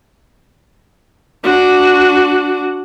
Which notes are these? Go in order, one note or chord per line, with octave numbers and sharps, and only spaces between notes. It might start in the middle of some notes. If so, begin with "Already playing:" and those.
D4 F#4